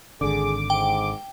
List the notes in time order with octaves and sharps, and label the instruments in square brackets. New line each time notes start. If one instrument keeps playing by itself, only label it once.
[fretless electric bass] G#1 D3 [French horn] G#4 [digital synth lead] D6
[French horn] G#2 [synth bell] G5